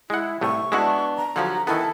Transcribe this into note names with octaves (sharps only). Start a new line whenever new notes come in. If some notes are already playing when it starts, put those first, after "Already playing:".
G#3 E4 F#5
C2 A2 A3 C#6
G#3 B3 D4 E4 F#4
A#5
D3 F3 F#3 F#4 G4
D#3 E3 B3 E4 A4